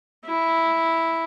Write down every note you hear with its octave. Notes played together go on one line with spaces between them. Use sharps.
E4